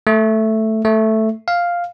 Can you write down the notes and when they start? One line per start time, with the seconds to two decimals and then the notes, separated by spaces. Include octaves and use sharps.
0.07 A3
0.85 A3
1.48 F5